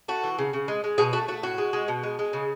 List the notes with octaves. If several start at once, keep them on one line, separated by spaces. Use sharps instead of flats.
A3 F#4
E3
C#3
C#3
G#3
G#3
B2 G#4
A3 F#4
A3 F#4
A2 F#4
G#3
G#3
B2
G#3
G#3
C#3